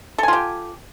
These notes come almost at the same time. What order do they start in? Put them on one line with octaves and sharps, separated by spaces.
A4 G#5 F4 G4